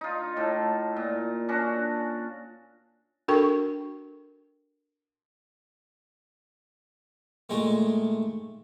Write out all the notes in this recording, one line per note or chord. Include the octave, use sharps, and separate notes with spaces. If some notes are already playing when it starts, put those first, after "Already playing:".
D#4 F4
A2 A3
A#2
C#4 D4 F#4
D4 F#4 A4 A#4 G5 C#6
A#2 D#3 G#3 A3